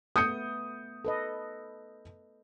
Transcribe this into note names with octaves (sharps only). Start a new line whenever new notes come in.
A3 B3 D#6 G6 C#7
A4 B4 D#5